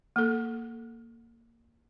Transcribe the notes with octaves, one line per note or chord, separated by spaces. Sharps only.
A#3 A4